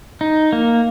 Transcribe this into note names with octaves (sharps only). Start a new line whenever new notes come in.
D#4
A#3